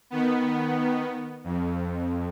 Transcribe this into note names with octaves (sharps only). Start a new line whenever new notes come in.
D#3 B3
F2